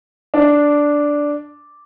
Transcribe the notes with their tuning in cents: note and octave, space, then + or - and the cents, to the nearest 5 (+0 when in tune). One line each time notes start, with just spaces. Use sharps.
D4 -5